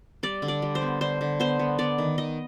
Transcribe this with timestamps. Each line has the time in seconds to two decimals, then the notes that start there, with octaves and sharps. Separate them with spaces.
0.23 G3 D5
0.42 D3
0.48 D5
0.62 G3
0.75 C5
0.82 B3
1.01 D3 C5
1.21 D3
1.40 B3 C5
1.59 B3
1.79 B3 D5
1.98 D#3
2.18 D#3 D#5